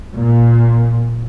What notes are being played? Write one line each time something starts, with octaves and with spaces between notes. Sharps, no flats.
A#2